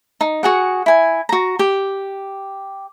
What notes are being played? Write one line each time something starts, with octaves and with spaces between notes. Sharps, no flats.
D#4
F#4 G#4 F#5
E4 G#5
F#4 A#5
G4